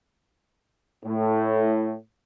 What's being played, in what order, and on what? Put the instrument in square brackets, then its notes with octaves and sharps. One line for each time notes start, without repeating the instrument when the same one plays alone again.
[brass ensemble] A2